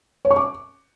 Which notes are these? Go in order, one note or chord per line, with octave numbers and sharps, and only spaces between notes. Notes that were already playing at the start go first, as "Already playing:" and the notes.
C#5
C#6
D6